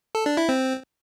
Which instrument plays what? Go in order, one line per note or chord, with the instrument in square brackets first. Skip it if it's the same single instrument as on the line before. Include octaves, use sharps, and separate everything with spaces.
[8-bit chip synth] A4
D4
E4
C4